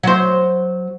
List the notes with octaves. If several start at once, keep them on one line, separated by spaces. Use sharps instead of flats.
F#3 C5